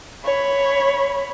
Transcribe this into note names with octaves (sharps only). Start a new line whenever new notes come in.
C#5 B5